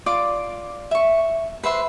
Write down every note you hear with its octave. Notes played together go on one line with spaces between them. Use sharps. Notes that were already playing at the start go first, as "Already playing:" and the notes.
F4 D5 C6 D6
E5 C#6
B4 C5 E5 C6